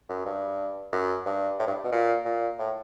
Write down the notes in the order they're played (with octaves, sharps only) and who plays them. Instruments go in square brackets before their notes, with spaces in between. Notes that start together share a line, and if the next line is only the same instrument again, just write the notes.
[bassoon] F#2
G2
F#2
G2
A2
G2
B2
A#2
A#2
A2